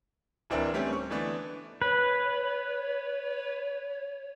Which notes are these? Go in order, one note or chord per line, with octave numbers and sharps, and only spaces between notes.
D1 E3 C4 D4 E4 A#4
G3 A3 C4 C#4
C#6
D3 E3 A3 B3 D4
B4 C#5